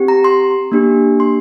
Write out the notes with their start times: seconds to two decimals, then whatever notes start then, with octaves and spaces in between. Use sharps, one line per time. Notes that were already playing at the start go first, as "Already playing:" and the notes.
Already playing: C4 G4
0.08 A#5
0.24 C6
0.72 A#3 D4 G4
1.20 C6